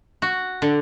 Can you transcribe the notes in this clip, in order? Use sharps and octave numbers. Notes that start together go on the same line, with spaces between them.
F#4
D3